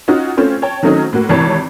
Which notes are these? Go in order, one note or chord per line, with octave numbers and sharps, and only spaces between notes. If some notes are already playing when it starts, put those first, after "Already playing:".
C#4 D#4 F4 F#4
A3 C4 C#4 F4 C5
C#5 G5 A5
D#3 F#3 A3 C4 C#4 D#4
A2 A#3 F#4
G#1 C3 E3 C#5 A5